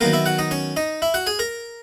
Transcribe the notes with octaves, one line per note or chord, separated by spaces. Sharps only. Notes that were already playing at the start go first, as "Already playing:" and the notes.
D#3 F#3 A#3 B3 A#4
E4 E5
F#4 F#5
D#4 D#5
C#4 C#5
D#4 D#5
E4 E5
F#4 F#5
G#4 G#5
A#4 A#5